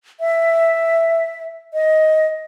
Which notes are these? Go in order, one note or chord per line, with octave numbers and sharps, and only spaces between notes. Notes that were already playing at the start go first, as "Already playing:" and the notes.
E5
D#5